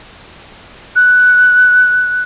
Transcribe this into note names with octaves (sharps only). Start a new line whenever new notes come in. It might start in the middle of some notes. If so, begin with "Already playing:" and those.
F#6